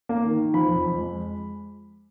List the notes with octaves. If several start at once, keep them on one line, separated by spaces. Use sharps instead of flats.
A#3
D#3
D#3
F3 B5
F2
F2
G#3